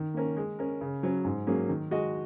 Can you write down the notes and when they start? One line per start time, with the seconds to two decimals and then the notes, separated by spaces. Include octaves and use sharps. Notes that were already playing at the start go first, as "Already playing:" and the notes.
Already playing: D#3
0.14 A#3 C#4 A#4
0.37 G#3
0.59 C#4 A#4
0.81 C#3
1.03 F#3 C#4
1.25 G#2
1.47 F#3 A#3 C#4 G#4
1.69 D#3
1.91 G#3 F#4 D#5